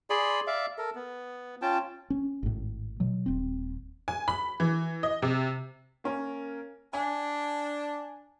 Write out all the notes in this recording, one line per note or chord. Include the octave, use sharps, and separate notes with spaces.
G#4 D5 B5 C6
D5 E5 F5
A4 A#4
B3
C#4 F4 G5 A5
C#4
G#1 A2
B2 F#3
D#1 C4
G#5
B5
E3
D#5
C3
A#3 C#4 A#4
D4 G#5